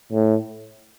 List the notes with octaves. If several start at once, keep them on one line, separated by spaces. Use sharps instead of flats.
A2